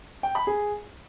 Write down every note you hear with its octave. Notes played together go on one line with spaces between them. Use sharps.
G5
B5
G#4